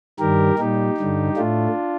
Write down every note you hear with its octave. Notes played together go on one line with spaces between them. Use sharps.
G2 D#3 G3 G4 A#4
A#2 G3 D#4 G4
G2 D3 G3
A2 A3 D4 F4